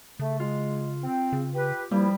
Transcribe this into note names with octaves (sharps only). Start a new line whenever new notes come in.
C#3 A3
G#3 F4
C4
C#3
G4 B4
G2 F3 G3 A#3 E4